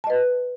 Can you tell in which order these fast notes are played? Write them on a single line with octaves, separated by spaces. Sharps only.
A5 D#5 B4